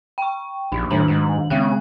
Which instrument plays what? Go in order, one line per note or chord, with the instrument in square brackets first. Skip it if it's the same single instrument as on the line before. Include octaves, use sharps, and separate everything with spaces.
[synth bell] G5 C#6
[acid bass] A#1 [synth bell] D#4
[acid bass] A2 [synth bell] D#3 D4 F#7
[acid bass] G#2
[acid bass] C#3 [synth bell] G#3 G5 F#6